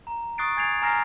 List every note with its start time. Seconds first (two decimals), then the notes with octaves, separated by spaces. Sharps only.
0.07 A#5
0.38 C#6 D#6 F#6 A6 C7 D7
0.57 G#5 G#6 A6 C7 D7 F7
0.82 G#5 A#5 F6 A#6 C7